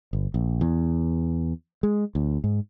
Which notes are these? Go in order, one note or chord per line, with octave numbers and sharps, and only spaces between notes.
G1
A#1
E2
G#3
D2
G#2